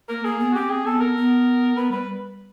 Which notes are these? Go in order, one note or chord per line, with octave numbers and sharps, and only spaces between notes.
A#3 A#4
A#3 G#4
B3
F#4
C4 G4
G#4
B3 A4
A#4
B3
B3 B4
G3 B4